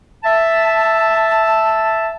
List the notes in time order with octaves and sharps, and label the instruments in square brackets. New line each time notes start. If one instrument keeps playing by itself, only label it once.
[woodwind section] E5 A5